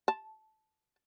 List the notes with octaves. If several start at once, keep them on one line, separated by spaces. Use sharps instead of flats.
A5